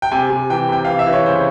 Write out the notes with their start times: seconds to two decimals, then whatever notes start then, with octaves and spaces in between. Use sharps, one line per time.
0.02 G5
0.12 C3 G#5
0.30 C3
0.50 E3 G5
0.69 C3 G5
0.85 E3 F5
0.99 E5
1.07 E3
1.13 C#5
1.26 C#3 C5